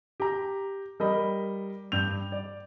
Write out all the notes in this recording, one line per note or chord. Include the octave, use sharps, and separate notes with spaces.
G4 A#5
G3 A#4 D#5 B5
G2 G6 F7
D5